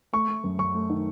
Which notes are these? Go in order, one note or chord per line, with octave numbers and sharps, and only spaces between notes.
A3 C#6
A3
F#2
F#2 C#6
A3
D#3